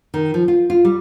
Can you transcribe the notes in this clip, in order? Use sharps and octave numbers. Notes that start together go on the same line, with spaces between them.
D#3
F3
F4
F4
G3